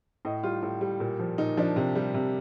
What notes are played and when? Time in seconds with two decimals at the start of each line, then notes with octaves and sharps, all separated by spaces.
0.25 A2 D#5
0.43 G3 F4
0.62 A2
0.81 G3
1.00 A#2
1.19 F3
1.38 A#2 D#4
1.57 F3 D4
1.76 C3
1.95 G3
2.14 C3